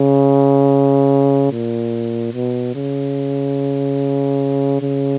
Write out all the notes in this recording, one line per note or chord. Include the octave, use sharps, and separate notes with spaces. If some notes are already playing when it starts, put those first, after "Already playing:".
Already playing: C#3
A#2
B2
C#3
C#3